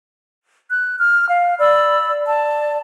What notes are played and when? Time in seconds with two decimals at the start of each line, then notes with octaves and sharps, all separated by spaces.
0.70 F#6
0.99 F6
1.29 F5
1.59 D5 B5 E6
2.26 D5 A5